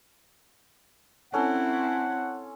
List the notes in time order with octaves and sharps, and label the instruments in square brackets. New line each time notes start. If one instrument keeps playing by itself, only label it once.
[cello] C4 E4 [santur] C#4 A4 C6 [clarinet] F#5